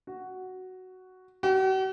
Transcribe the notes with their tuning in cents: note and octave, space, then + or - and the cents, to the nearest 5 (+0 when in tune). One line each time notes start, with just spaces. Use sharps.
F#4 +5
F#4 +45